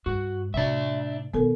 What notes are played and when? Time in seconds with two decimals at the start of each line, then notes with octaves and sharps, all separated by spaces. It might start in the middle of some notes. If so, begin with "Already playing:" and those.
0.06 G2 F#4
0.54 A2 C3 D4 E5
1.34 B2 D#3 B3 A4 A#4